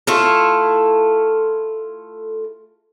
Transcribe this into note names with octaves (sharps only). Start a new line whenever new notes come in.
A3 E4 F4 A4